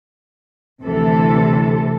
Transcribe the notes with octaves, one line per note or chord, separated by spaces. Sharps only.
D2 C3 E3 A4